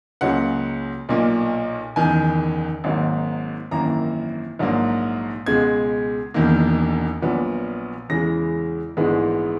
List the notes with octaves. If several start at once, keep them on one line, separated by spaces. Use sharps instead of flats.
C#2 C#3 F#3 A#3 F#5
B1 A#2 A#3
F#1 E2 D#3 G#5
G#1 G#2 F#3 A#3
G#1 F#2 E3 A#3 A#5
A#1 G#2 F#3 A#3
C#2 B2 G#3 G#6
E1 E2 D#3 A#3
A#1 A#2 F#3 B3
E2 C#3 E3 G#3 A#6
A#1 G#2 E3 G#3 B3